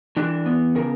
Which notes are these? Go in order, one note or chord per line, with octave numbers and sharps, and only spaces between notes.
E3 D4
B3
C#3 A#4